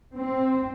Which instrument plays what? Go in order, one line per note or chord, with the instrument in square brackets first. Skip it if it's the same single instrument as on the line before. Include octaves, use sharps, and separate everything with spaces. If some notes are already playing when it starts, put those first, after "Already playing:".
[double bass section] C4